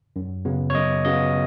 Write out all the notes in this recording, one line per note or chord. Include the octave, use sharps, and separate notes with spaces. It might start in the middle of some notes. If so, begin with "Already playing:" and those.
F#2
C#3 F#3 B3
C#5
F#2 D#5
C#3 F#3 B3 D#5